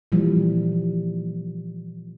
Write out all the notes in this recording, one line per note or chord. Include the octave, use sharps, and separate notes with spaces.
A#2 E3 F3 G3